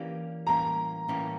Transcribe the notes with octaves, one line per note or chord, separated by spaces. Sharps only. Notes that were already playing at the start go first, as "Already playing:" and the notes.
Already playing: E3 A#3 C#4 G4 D5
A2 E3 G3 A#3 C#4 A#5
A2 E3 G3 A#3 C#4